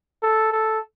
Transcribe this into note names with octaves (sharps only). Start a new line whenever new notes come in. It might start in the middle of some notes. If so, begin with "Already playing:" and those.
A4
A4